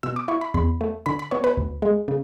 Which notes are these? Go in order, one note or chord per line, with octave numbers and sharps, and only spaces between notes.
B2 E6
D6
E4 C#6
B5
E2 B5
A3
D3 B5
B5
B3 C#5
B4
D2
G#3
C#3